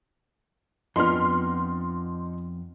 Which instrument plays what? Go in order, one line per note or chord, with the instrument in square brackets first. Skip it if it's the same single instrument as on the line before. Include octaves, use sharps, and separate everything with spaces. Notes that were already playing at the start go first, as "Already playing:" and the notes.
[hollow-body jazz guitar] F2 B3 [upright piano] F3 D4 D#4 [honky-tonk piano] C6 F6